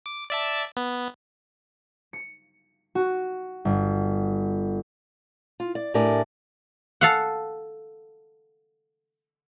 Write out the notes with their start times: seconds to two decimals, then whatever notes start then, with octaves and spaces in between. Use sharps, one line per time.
0.06 D6
0.30 D5 E5 A5
0.77 B3
2.13 C#7
2.95 F#4
3.65 G1
5.60 F4
5.75 D5
5.94 A2 D4 G4 A#4 D5 G#5
7.01 A4 F5 F#5